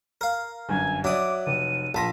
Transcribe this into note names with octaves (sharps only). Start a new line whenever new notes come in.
A#4 F5
G1 F#2 G#5
F#3 D5 E5 D6 D#6
F1 D#7
A#1 A5 B5 C6 A#6